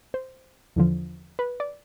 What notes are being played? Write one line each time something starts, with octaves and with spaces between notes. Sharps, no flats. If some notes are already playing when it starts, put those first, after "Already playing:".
C5
E2 D3 F3
B4
D5